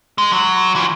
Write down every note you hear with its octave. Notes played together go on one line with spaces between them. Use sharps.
G#3
F#3
E3
F3